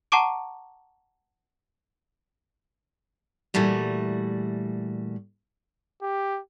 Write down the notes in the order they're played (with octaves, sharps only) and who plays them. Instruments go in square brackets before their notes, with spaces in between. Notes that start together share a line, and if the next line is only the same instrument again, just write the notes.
[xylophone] F#5 A5 A#5 C#6 D6 D7
[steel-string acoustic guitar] A#2 E3 G3 A3 F#4
[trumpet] G4